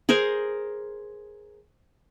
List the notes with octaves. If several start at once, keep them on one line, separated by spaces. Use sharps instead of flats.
G#4 A#4 C5 G#5